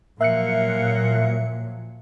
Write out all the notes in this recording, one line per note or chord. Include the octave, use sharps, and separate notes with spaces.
A#2 F3 F#3 A#3 E5 F#6 C#7